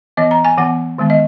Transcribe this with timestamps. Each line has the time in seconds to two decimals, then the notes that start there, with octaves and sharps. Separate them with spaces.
0.17 E3 B3 D#5
0.31 A#5
0.45 G#5
0.58 E3 B3 F#5
0.98 D#3 G#3 B3
1.10 D#5